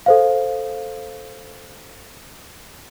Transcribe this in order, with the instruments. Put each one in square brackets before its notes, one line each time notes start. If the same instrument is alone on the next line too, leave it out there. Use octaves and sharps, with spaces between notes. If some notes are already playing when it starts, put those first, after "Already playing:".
[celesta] A4 C5 F5